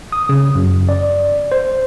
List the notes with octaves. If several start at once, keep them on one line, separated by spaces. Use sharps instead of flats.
D#6
C#3
F#2
D5
C5